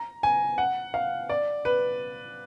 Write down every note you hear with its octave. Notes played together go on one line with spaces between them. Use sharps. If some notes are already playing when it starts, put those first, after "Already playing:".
Already playing: A#5
G#5
F#5
F5
D5
B4